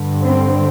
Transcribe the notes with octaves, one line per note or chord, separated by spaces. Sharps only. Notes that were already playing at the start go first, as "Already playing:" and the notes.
Already playing: G2 D3
C4